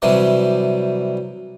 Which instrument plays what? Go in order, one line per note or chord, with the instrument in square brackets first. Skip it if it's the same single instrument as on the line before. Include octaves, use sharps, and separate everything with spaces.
[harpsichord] C3 E3 F#3 G3